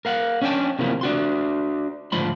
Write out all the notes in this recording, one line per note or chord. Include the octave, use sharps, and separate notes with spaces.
A#4 F5 F#5
C#4 D4 C#5 D5 G5 A5
C3 D#3 F3 A#3 E4
D4 F#4 C6
D2 G#2 F3 B5 C6